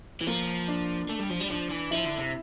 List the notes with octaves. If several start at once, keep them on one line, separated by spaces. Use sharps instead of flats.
E3
F3 A#3
D4
A3
G3
F3
G3
F3 D4
E3
F3 E4
D3
C3